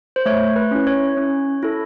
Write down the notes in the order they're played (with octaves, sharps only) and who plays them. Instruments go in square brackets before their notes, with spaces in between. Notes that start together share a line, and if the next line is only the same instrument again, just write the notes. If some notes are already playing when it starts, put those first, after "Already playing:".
[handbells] C5
A3 C#5
B4
C#4 E4
C#5
C#4
E4 A4